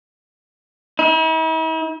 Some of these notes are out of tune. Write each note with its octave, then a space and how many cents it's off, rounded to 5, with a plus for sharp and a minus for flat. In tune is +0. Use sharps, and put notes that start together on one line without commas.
E4 -45